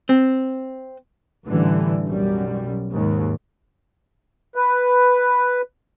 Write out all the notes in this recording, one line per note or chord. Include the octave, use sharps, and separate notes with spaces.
C4
A1 D3 E3 G3
B1 F#2 G3
D#2 G#2
B4